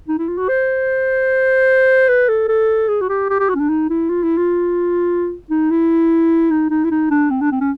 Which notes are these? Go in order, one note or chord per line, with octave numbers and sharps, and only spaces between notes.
D#4
E4
F4
F#4
C5
B4
A4
A4
G#4
F#4
G4
G4
G4
F#4
C#4
D4
D#4
E4
F4
E4
F4
D#4
E4
D#4
D#4
E4
D#4
D4
C4
D4
C4
C#4